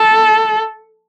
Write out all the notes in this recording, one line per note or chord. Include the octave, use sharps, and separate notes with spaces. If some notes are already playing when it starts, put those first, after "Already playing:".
Already playing: A4